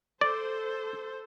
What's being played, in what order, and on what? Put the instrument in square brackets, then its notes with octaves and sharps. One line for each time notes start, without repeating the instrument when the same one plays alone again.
[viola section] A4 C5 [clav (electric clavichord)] D5